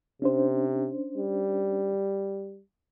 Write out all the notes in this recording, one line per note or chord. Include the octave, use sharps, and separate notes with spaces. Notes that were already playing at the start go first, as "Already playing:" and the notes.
C3 C#4 D4 C5
G3